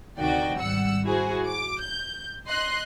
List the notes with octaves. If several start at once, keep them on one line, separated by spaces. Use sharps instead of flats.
D2 C3 D#3 F#4 D5 G5
G#1 G3 F#5 E6 C#7
E4 F#4 G#4 C5
D6
G6
D#5 C6 F#6